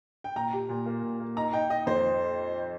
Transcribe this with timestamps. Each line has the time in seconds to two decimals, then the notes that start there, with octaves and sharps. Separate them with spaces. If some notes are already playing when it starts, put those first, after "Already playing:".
0.24 G5
0.35 A#2 A#5
0.53 G4
0.69 A#2
0.86 A#3
1.03 A#2
1.20 A#3
1.37 D#4 A#5
1.53 D#4 G5
1.70 D#4 D#5
1.86 F2 C5